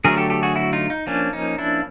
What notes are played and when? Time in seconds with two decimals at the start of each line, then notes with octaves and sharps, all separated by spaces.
0.05 D3 F#3 A3 G#4 A#4
0.17 G4 A4
0.30 G4 A4
0.43 F#4 G#4
0.56 E4 F#4
0.73 D#4 F4
0.90 D#4
1.07 F3 A#3 C#4 D4
1.33 D#4
1.58 D4 E4